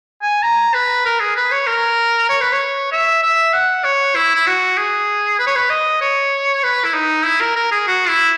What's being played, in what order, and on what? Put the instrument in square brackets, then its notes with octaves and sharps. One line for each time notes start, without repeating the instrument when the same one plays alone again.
[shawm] G#5
A#5
B4
A#4
G#4
B4
C#5
A#4
C#5
B4
C#5
E5
E5
F#5
C#5
E4
E4
F#4
G#4
B4
C#5
B4
D#5
C#5
B4
E4
D#4
E4
A#4
A#4
G#4
F#4
E4